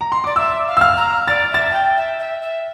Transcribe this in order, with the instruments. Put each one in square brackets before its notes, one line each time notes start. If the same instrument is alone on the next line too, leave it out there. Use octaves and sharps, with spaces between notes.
[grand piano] A#5
C6
[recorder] D5 [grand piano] D6
[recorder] E5 [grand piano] E6
[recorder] F5
[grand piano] E6
F6
[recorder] A#5
[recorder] D5 [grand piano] A6
[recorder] E5 [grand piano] A6
[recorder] A5
G5
E5
E5
E5